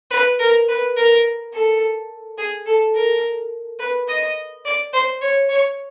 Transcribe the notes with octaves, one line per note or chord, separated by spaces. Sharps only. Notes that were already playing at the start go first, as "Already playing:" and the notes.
B4
A#4
B4
A#4
A4
G#4
A4
A#4
B4
D#5
D5
C5
C#5
C#5